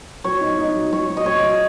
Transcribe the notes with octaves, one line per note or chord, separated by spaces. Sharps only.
F#3 C#5
D#4
D#4
F#3
F#3 C#5
F#3
D#5
F#3 C#5
F#3